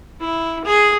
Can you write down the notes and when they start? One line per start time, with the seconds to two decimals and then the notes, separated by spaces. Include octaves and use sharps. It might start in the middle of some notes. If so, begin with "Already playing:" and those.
0.21 E4
0.65 G#4